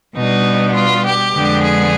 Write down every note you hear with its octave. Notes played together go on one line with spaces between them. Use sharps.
B2 G3 B3 D4 D#4
F4
G4
F2 D3 G#3 B3 D4
G#4